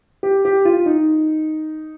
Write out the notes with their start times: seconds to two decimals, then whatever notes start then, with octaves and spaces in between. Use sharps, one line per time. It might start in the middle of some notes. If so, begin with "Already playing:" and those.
0.23 G4
0.45 G4
0.65 F4
0.86 D#4